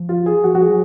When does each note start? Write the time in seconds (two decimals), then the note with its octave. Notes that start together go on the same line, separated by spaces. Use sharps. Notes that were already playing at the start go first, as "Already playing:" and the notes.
Already playing: F3
0.09 F4
0.26 G#4
0.43 F3 F#4
0.55 F#4
0.61 G#4
0.69 F#3